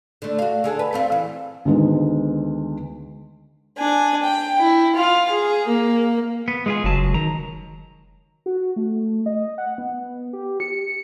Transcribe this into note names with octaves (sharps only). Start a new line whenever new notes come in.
D3 A3
F#4 F5
D3 G#4 A4
B4
A3 C4 F4
E3
D2 D#3 G#3 B3
D4 G#5
G5
E4
F4 F5
G#4
A#3
B3
G#3 F4 G#4
F1 C#2 F#3 A5
D#3 A#5
F#4
A3
D#5
F#5
B3
G4
C#7